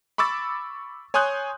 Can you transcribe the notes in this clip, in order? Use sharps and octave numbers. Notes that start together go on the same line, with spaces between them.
B5 C#6 D6 E6 A6
C#5 G#5 C6 D#6 F#6 G6